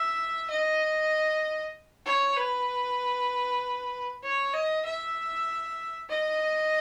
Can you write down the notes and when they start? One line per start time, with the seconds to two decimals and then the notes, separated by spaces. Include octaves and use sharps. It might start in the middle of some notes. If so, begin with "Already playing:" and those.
Already playing: E5
0.50 D#5
2.06 C#5
2.37 B4
4.23 C#5
4.53 D#5
4.85 E5
6.09 D#5